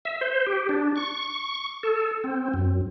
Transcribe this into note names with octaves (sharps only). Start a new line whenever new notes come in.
E5
C5
G4
D4
C#6
A4
C4
F#2